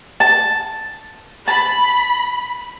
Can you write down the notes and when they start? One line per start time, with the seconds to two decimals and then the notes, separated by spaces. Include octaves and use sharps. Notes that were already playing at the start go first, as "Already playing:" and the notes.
0.20 A5
1.48 A5 B5